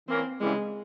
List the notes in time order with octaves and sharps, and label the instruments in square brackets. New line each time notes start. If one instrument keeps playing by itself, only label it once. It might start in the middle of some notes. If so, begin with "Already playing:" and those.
[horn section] E3 A#3 C#4 [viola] C4
[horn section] C#3 E3 G3 [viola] G#3